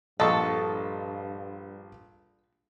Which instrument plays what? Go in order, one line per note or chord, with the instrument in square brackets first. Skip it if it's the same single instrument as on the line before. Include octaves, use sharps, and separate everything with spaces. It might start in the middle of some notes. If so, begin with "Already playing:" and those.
[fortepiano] A#1 D#5 [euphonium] G2 [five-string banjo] A4 [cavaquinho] A5 C#6